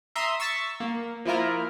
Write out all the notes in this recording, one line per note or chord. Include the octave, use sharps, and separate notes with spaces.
E5 A#5 C6 D#6
C#6 E6 A6 B6
A#3
F3 A#3 E4 F4 A#4